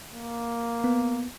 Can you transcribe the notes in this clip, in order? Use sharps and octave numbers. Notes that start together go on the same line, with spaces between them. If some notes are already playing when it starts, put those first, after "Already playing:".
A#3
B3